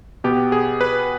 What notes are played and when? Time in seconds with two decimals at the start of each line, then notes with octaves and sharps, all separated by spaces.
0.24 B2 B3 G4
0.52 G#4
0.81 B4